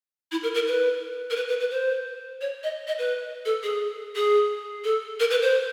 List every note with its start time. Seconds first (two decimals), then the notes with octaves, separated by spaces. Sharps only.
0.32 E4
0.43 A#4
0.54 A#4
0.67 B4
1.31 A#4
1.36 B4
1.49 B4
1.60 B4
1.71 C5
2.41 C#5
2.63 D#5
2.87 D#5
2.99 B4
3.45 A4
3.63 G#4
4.16 G#4
4.84 A4
5.20 A#4
5.31 B4
5.42 C5